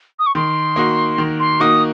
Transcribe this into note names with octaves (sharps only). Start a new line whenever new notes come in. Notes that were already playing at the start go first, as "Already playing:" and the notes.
D#6
C#6
D#3 C6
A#3 D#4 F#4
D#3
C6
A#3 D#4 F#4 D#6